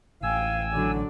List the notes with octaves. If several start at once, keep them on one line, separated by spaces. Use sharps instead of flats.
A1 F5 G5 G#5 E6
D3 F#3 D4 D5